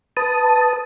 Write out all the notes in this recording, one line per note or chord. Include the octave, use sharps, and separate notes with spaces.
B4 A5 D#6